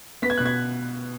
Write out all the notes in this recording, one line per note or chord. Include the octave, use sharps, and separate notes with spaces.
B3 B6
G#6
B2 F#6
G#6